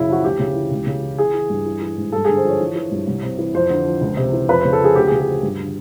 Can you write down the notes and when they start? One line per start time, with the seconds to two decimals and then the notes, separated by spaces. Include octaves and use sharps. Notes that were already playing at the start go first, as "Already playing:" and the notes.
Already playing: F#2 C#3 E4
0.08 F3 F#4
0.24 D2 G4
0.39 C#3
0.56 E3
0.71 C#2
0.87 C#3
1.03 E3
1.18 E3 G#4
1.34 E3
1.50 G2
1.66 E3
1.81 E3
1.97 G#2
2.12 G2 A4
2.25 G#4
2.29 D3
2.36 C5
2.45 F3 C#5
2.60 E3
2.76 E3
2.91 G2
3.07 C2
3.23 C3
3.39 E3
3.54 F2 C5
3.70 D3
3.86 F3
4.01 C#2
4.17 C3
4.33 E3
4.49 F2 B4
4.61 C5
4.65 C#3
4.73 A4
4.80 F3 G#4
4.96 D2 G4
5.07 G#4
5.12 C#3
5.19 G#4
5.27 F3
5.43 G2
5.59 D3